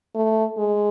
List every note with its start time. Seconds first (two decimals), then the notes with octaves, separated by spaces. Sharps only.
0.15 A3
0.58 G#3